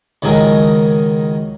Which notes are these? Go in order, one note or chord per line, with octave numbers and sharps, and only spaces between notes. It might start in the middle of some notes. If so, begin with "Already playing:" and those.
C#2 D#3 F#3 G#4 A#4 D#5